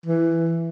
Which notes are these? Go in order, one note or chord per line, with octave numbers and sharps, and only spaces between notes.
E3